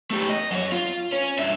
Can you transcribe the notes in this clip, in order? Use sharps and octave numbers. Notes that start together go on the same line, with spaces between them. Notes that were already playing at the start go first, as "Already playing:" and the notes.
A3 G4
D#5
F#2 C#5
F4
C#4
G2 E5